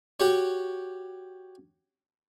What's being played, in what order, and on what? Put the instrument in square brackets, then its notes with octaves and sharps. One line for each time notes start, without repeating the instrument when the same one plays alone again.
[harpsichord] F#4 G4 C#5